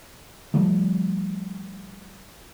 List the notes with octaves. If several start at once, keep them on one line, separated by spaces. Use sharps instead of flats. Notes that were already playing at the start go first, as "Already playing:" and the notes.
E3 F3 G3 A3